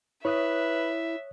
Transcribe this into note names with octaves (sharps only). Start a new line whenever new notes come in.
E4 B4 C#5 E5 D#6 F#6